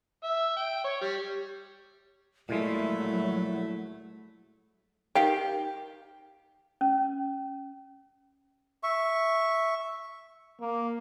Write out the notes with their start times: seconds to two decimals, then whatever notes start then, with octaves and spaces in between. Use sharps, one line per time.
0.23 E5
0.57 G5
0.84 C#5
1.01 G3
2.49 A#2 F#3 G#3 A3 E4
5.15 D#3 G4 F5 G5
6.81 C#4
8.83 E5 C#6
10.61 A#3